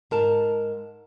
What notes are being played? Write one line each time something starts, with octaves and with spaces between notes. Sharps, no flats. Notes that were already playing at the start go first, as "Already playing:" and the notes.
G#2 A#4 A5